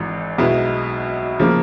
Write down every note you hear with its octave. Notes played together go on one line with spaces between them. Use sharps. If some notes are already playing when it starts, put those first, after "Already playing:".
Already playing: G#1 G#2 E3
B1 B2 G#3 B3 E4
C#3 F3 A#3